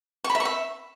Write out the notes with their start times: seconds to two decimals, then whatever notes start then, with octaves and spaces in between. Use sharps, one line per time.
0.24 C#6
0.30 B5
0.35 E5
0.40 C#6
0.45 E5